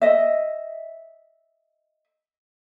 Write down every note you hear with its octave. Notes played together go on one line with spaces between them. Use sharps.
D#5 E5